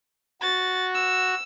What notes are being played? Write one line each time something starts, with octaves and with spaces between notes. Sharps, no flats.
F#4 A6
E6